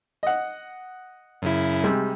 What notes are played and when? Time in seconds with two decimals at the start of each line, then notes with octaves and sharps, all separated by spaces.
0.23 D#5 F#5
1.42 F#2 C#3 E4
1.84 C3 G3 G#3